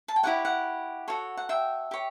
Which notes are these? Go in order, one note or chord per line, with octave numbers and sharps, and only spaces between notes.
A5
G5
E4 G4 C#5 F#5
F#5
F#4 A4 C#5
F#5
E5 G5
G4 C#5